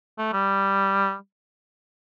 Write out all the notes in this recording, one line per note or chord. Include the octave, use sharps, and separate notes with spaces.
A3
G3